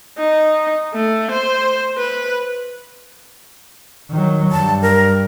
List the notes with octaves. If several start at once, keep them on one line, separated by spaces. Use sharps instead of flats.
D#4
A3
C5
B4
D#3 F#3
G2 A5
A#4